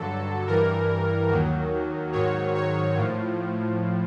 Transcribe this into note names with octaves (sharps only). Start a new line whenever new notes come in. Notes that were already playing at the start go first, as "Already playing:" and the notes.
Already playing: G2 D3 F#3 A4
G2 E3 G3 A#4
D#2 D#3 F#3
G#2 D#3 F#3 C#5
C#5
A2 F3